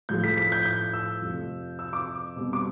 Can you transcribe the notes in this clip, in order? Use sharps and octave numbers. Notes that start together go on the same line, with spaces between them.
A2 F3 A3 G6
B6
B6
G6
G6
E6
F2 C3 F3
E6
D6
B2 G3 C4
D6